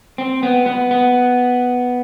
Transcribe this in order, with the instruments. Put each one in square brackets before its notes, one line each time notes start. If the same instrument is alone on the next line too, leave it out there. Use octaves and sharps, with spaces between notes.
[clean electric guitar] C4
B3
B3
B3